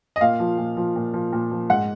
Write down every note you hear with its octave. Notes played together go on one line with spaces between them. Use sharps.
D#5
A#2 F5
F3
A#2
F3
A#2
F3
A#2
F3
G#2 F#5